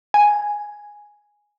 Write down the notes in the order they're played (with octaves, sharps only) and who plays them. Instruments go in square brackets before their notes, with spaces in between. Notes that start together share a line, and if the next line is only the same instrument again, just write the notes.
[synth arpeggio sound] G#5